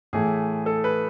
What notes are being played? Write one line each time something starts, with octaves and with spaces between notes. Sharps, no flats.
A2 E3 A3 G#4
A4
B4